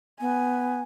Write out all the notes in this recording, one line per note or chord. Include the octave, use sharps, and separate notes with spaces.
B3 G#5